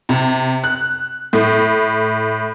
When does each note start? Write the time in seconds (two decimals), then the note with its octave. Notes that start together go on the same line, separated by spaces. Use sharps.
0.09 C3
0.64 F#6
1.33 A2